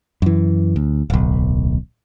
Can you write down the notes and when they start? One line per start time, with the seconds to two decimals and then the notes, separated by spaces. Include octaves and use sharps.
0.22 F#2 E3
0.76 D2
1.10 D1 B1